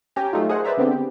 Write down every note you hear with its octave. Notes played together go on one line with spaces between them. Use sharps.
C#4 G4 G5 G#5 A#5
F#3 A3 D#4 F4
G#4 A#4 C5 D#5 F#5
B4 C5 D5 E5 A#5
D3 B3 C4 D4 G4 G#4
G4